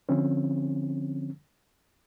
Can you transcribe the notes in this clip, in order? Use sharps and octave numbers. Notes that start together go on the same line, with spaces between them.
D3 F3 C4 C#4